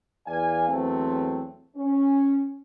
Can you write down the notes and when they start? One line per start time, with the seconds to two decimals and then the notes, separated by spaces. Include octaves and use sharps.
0.27 E2 D5 F5 G#5
0.68 E2 F#3 A3 C4
1.76 C#4